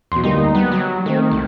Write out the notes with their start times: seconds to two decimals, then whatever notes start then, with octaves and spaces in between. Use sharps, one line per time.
0.12 E2 B2 C6
0.24 D2 G3 A#3 D#4
0.55 G3 B3
0.72 F#3
1.06 D#3 A3 C4
1.31 C2